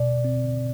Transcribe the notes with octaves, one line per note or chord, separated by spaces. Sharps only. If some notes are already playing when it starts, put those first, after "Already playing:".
Already playing: B2 D5
C4